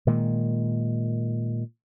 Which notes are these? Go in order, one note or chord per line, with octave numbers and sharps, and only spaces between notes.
A#2 D#3 G#3